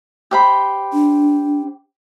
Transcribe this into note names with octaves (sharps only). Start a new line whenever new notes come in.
G4 C5 B5
D4